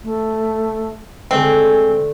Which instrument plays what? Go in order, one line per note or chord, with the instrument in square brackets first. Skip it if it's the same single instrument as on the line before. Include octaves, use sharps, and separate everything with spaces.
[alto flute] A3
[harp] D3 A3 [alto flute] G#3 [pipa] C4